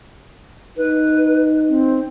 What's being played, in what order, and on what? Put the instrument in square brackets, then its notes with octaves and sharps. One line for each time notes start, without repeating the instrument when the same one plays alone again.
[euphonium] D#4 [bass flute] B4
[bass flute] C4